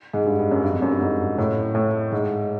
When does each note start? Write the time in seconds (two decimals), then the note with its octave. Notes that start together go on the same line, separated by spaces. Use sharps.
0.13 G#2
0.26 G2
0.39 G2
0.51 F#2
0.64 G2
0.73 F2
0.82 F#2
0.91 G2
1.01 G#2
1.38 A2
1.75 A2
2.12 G#2